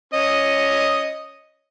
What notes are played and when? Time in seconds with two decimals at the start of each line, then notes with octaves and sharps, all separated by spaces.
0.14 C#4 D#5